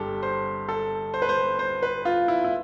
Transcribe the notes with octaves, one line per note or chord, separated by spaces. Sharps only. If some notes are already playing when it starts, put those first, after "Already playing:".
Already playing: G1 G2 D3 G4 A4
C5
A4
C5
B4
C5
C5
B4
F4
E4
E4